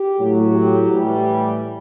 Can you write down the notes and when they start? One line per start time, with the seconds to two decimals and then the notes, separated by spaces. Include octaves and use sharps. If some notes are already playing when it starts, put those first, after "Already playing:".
Already playing: G4
0.19 A2 F#3
0.54 G4
0.88 A2 E3 G3